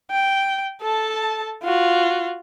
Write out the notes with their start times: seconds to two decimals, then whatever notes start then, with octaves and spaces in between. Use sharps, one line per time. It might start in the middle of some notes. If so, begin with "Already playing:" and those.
0.11 G5
0.81 A4 A5
1.64 F4 F#4